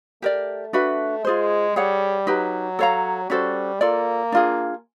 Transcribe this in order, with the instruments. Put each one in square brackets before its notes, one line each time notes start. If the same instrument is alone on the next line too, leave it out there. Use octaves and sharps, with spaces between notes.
[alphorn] A3 [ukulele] G4 A#4 D5
[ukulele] D4 F#4 B4 E5
[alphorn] G#3 [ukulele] F4 G#4 C5
[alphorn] G3 [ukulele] G#4 C#5 F#5
[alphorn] F#3 [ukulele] D#4 G4 B4
[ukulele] A4 C#5 F5 A#5
[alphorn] G3 [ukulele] C#4 F#4 A4 C5
[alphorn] A#3 [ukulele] F4 A4 D5
[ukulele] D4 F4 G#4